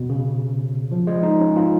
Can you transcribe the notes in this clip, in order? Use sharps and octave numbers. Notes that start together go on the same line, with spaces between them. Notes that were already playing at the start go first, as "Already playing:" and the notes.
Already playing: B2
C#3
F3
G#3
D#4
C#4
F4